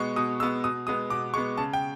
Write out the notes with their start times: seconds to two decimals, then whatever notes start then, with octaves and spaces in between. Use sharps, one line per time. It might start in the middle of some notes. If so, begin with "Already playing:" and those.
Already playing: B2 G#3 B3 C#6
0.16 B2 D#6
0.40 G#3 E6
0.43 B3
0.64 B2 D#6
0.87 G#3 B3 D#6
1.10 B2 D6
1.34 G#3 B3 C#6
1.57 C#3 A5
1.73 G5